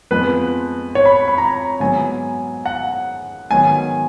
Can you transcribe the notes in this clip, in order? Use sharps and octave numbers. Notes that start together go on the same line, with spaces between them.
F2 F3 G#3 B3 B4
C#5
B5
B5
A#5
G#2 F#3 B3 G#5
F#5
G#2 D#3 F#3 B3 G#5